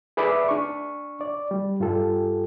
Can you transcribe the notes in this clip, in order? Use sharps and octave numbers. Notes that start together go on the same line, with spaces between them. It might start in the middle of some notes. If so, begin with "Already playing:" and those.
G#4 B4 D5 E5 B5 D6
D4 C#6
D5
G3
G2 F4 G4 A4